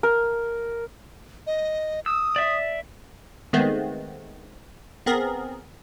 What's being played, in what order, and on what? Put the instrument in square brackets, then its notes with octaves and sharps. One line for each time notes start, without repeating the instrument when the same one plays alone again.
[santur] A#4
[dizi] D#5
[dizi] D#6 [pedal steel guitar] E6
[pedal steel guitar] D5 E5
[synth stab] D#3 G#3 A3 B3 C4
B3 C4 G#4 A#4